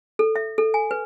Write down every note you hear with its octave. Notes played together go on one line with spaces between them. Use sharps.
A4
E5
A4
G#5
B4